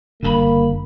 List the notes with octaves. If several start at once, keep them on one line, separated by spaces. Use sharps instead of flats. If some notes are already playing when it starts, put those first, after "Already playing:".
F#1 G2 D3 A#3 A4 B5